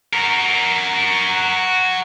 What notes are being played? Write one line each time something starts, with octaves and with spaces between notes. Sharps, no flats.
F#4 A#4